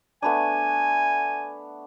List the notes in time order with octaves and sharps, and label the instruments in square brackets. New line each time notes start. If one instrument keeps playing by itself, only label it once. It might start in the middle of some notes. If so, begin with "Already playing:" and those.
[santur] A3 B3 D4 [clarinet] G#5